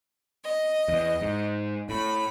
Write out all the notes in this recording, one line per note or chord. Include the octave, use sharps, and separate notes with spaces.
D#5
E2
G#2
A2 B5